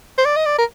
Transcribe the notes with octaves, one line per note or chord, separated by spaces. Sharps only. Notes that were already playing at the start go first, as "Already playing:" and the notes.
C5
D5
D#5
D5
A#4